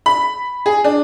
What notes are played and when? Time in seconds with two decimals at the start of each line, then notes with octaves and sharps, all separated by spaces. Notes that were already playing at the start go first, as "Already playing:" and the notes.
0.06 B5
0.66 G#4
0.84 D4